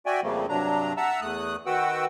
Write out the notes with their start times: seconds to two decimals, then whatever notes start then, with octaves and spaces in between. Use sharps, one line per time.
0.06 F#4 D5 E5 G5 G#5
0.23 F2 C#3 F3 G3 A3 A#3
0.49 G2 C3 F#3 D4 A#5
0.97 E5 F#5 A5 A#5 E6
1.21 E2 A3 D#6 F#6
1.66 D#3 F#4 B4 F#5 G5 E6